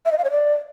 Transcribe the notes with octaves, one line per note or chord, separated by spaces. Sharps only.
E5
D#5
F5
C#5
D5